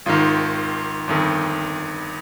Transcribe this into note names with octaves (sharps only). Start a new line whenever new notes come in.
G#1 G#2 D#3 F4
G1 F2 D#3